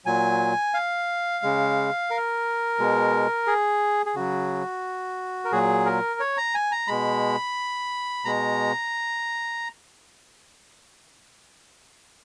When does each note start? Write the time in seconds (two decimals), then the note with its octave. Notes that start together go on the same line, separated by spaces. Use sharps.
0.05 A#2 F#3 G#5
0.74 F5
1.43 C#3 G#3
2.11 A#4
2.79 B2 G#3
3.47 G#4
4.06 G#4
4.15 C#3 F#3 F#4
5.45 A#4
5.52 A#2 F#3 G#4
5.86 A#4
6.20 C#5
6.37 A#5
6.55 G#5
6.72 A#5
6.88 B2 G#3 B5
8.25 B2 G#3 A#5